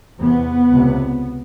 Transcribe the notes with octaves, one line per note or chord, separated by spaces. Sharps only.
E2 C3 B3
C#2 C3